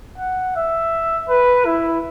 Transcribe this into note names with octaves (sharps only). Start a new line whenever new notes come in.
F#5
E5
B4
E4